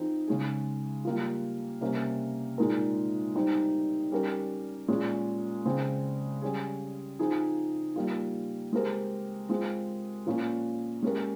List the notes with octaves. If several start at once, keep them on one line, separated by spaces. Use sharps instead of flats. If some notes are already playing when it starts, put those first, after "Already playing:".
Already playing: F3 C4 D#4 G#4
C#3 G#3 C#4 G#4
G3 A#3 F4
C3 G3 A#3 C#4
A#2 G#3 D#4 A#4
G3 C4 D#4
G3 C#4 G4 A#4
A#2 G#3 C#4
C#3 G#3 C4
G3 C#4 G#4
F3 C4 D#4 G#4
G3 A#3 F4
G#3 C4 G4 A#4
G#3 C4 F4
A#2 F3 A#3 C#4 F4
G#3 C#4 G4 A#4